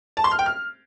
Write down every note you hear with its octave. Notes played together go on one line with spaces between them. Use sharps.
A5
C6
F6
G5
F6